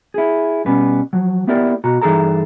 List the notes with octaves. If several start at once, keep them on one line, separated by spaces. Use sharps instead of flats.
E4 G#4
B2 G3 B3 C#4 B4
F3 F#3
A#3 B3 E4 G4 A#4 D5
B2 F#4 A#5
G2 E3 D#4 G#4 A4 A#5